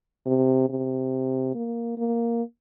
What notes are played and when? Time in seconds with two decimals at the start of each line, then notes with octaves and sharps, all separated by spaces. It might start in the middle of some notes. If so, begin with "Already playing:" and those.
0.26 C3
0.69 C3
1.55 A#3
1.97 A#3